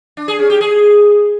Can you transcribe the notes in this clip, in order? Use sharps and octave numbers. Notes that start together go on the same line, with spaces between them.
D4
G#4
C#4
G4
G#4